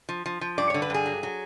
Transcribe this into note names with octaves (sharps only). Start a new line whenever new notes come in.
F3
F3
F3
G2 D5
D3 C#5
B4
G2 G#4
F#3
F#3